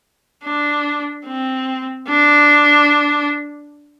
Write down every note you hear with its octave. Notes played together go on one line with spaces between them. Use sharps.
D4
C4
D4